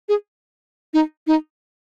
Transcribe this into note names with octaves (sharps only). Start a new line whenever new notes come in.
G#4
D#4
D#4